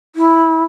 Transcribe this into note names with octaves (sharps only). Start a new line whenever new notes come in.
E4